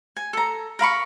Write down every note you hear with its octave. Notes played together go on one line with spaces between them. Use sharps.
G#5
A4 A#5
A#4 F5 B5 C#6